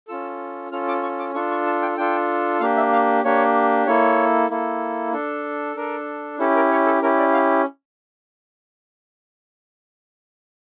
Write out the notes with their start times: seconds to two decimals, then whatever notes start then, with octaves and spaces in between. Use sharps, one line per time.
0.08 C#4 F4 A4 E6
0.72 C#4 F4 A4 F6
0.88 D6
1.03 C#6
1.19 D6
1.34 D4 F4 A4 C#6
1.51 C#6
1.66 A5
1.82 G5
1.97 D4 F4 A4 G5
2.60 A#3 D4 G4 F5
2.77 E5
2.93 F5
3.24 A#3 D4 G4 C#5
3.87 A#3 E4 A4 C#5
4.50 A#3 E4 A4
5.12 D4 A4
5.76 D4 A4 A#4
6.39 C#4 E4 G4 A4
6.56 A#4
6.71 C#5
6.86 A4
7.02 C#4 E4 G4 A#4
7.18 D5
7.33 F5